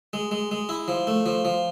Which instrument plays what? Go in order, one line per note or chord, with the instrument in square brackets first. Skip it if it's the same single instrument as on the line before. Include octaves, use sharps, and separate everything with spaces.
[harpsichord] G#3
G#3
G#3
E4
F3
A3
F3
F3